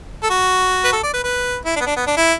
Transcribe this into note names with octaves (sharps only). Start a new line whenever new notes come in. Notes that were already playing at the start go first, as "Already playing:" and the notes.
A4
F#4
B4
A4
D5
B4
B4
E4
D4
B3
D4
B3
D4
E4